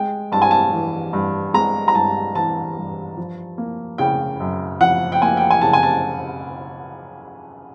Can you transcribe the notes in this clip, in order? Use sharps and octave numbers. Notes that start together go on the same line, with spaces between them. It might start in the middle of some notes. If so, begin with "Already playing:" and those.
Already playing: G#3 G5
G2 A5
G#5
A5
E3
G2
G#3 A#5
A#5
G2 A5
E3 A5
G2
F3
A#3
C#3 G5
F#2
F3 F#5
G5
A#3 G#5
G5
G#5
C#3 A5
G#5
A5